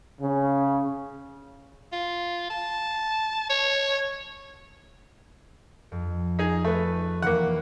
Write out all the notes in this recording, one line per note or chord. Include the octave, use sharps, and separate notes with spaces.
C#3
F4
A5
C#5
F2
D#4 G#4
A3 B4
D#2 E3 A#3 B4 F#5